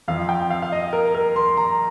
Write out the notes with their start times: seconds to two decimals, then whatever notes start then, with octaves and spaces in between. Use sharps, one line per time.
0.08 F2 F3 F5
0.29 G5
0.50 F5
0.62 F5
0.72 D#5
0.93 A#4
1.15 A#4
1.36 C6
1.57 A#5